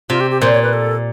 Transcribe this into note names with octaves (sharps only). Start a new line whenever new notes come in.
C3 F4
G4
G4
A#2 C5
C#5
B4
A4